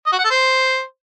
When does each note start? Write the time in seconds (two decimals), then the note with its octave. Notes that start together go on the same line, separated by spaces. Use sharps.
0.07 D#5
0.13 F#4
0.19 F#5
0.25 A4
0.31 C5